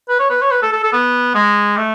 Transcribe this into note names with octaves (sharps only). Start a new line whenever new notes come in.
B4
C#5
B4
C#5
B4
A4
A4
A4
B3
G#3
A3